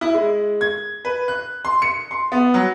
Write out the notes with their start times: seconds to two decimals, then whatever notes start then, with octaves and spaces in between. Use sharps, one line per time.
0.01 E4
0.14 G#3
0.61 G#6
1.05 B4
1.28 F#6
1.65 C6
1.82 C#7
2.11 C6
2.32 B3
2.54 F#3